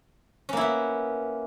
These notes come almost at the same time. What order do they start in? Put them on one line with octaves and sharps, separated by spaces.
C#4 A#3 E4 B3